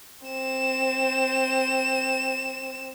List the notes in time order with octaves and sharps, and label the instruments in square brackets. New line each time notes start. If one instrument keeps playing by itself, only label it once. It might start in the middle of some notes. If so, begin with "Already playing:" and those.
[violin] C4 E7